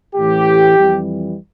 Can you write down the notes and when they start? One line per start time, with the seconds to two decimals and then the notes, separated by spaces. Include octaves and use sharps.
0.15 A1 A2 E3 G4
0.75 F2 E3 G3